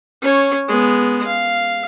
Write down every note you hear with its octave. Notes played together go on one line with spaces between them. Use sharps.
C#4 C#5
G#3 B3
F5